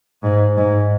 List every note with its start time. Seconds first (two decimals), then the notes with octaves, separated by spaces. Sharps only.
0.23 G#2
0.58 G#2